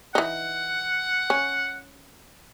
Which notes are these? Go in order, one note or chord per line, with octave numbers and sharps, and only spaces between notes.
E3 D#4 F#5
C#4